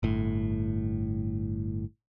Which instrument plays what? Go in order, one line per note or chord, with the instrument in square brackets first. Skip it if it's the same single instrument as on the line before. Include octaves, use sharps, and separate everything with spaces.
[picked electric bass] G1 A2